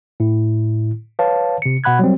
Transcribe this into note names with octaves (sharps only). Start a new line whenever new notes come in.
A2 E4
B4 C#5 F5 A5
C3 C#7
B2 F#5 B5 F#6 G#6
F#3 G3 C4